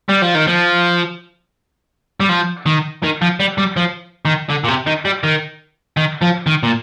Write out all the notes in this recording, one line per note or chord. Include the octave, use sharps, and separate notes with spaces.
G3
F3
D#3
F3
G3
F3
D#3
D#3
F3
G3
G3
F3
D#3
D3
A#2
C3
D#3
G3
D#3
D#3
F3
D#3
A#2